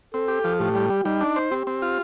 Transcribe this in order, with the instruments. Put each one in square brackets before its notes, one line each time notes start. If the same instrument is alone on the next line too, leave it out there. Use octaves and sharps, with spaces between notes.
[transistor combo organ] C4 [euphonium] A4
[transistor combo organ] G4
F3
[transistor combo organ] A2 [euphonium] G4
[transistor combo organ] G3
G3
[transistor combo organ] G3 [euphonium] D#4
[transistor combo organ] D4
C5
[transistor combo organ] C4 [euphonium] G4
[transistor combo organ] C4
F4